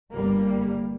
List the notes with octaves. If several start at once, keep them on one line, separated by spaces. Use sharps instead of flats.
G1 G3 A#3